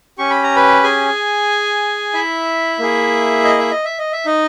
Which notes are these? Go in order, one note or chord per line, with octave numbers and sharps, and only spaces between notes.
C#4 G4 C#6
B5
A#5
B4 B5
G#4 G#5
E4 E5
A#3 E4 G#4
D#5
E5
D#5
E5
D#5
E5
D#4 D#5